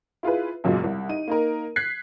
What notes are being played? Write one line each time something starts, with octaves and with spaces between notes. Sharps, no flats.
E4 F4 G#4 B4
B1 F#2 A#2 C#3 F#3 G#3
C2
D#4 D#7
A#3 D#4 A#4
F#6 G#6 B6 C7